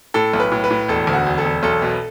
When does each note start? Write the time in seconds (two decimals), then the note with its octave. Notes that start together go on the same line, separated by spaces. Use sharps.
0.14 A2 A4
0.33 B1
0.40 B4
0.52 A2
0.64 B4
0.71 A2
0.88 E1 A4
1.07 D2
1.13 F#4
1.26 E1
1.38 A4
1.44 E1
1.63 B1 A4
1.82 B2